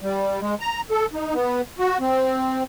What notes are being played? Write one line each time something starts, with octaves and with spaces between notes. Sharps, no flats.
G3
G#3
A#5
A4
D#4
B3
F#4
C4